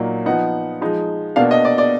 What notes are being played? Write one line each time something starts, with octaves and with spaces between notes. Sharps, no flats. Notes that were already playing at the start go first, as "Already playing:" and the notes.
Already playing: A#2 F#3 A#3 D#4
F3 B3 D#4 F#5
F3 G#3 D#4
B2 A#3 D4 F5
D#5
D5
D5